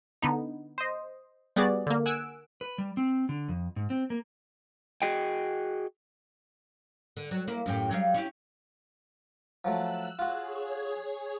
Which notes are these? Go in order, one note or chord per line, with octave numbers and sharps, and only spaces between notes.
D3 B3 D#4
C5 D#5
G3 B3 F#4 G#4 D5
D3 A#3
F#5 G#5 E6 D7 E7
B4
G3
C4
D3
F2
G#2
C4
A#3
F#4 G#4 D#5 G5
D3
F#3
A#3 E4
F#2 A2 G4
F#3 G3 F5
C#4 E4 G4
F3 F#3 A3 E6 F#6
F4 F#4 G#4 C#5